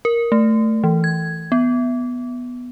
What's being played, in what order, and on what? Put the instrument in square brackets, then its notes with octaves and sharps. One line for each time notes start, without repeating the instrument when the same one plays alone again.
[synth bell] A#4
A3
E3
G#6
B3